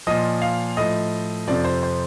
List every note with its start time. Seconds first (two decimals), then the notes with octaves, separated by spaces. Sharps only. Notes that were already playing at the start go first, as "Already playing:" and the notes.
0.07 A#2 F3 D#5
0.42 F5
0.77 A2 F3 D#5
1.48 F2 C3 F3 D5
1.65 C5
1.83 C5